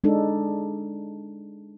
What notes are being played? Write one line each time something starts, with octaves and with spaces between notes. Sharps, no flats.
G#3 D4 D#4 A4